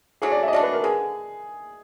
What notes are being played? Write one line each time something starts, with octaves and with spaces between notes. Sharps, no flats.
F#3 A3 D4 G#4
D5
E5
D#5
F#3 A3 D4 D5
B4
A#4
D3 G#4